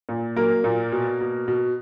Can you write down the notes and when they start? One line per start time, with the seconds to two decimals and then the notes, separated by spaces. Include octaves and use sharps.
0.09 A#2
0.36 F#3 A#3 A#4
0.64 A#2
0.92 B2
1.21 B2
1.48 B2